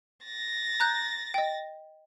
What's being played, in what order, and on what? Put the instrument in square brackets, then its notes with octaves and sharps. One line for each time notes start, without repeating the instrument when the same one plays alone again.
[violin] A6 A#6
[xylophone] A#5 F#6 G6
D#5 G5